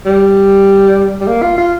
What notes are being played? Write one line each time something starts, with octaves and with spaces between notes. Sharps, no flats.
G3
G3
A#3
F4
F4